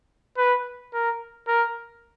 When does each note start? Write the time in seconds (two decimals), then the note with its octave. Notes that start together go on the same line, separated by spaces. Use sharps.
0.38 B4
0.93 A#4
1.48 A#4